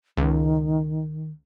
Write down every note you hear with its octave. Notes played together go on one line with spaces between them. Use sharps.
C#2 D#3